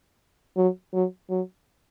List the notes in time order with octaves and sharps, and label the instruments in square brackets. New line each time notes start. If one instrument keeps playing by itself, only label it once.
[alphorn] F#3
F#3
F#3